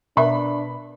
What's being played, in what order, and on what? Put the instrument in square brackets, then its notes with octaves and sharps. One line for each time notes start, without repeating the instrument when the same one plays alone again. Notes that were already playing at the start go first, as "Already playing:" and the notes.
[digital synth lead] B2 [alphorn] D4 [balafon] A#4 E5 C#6 [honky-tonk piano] B5